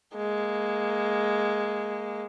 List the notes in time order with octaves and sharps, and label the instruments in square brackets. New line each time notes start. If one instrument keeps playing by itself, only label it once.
[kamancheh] G#3 A#3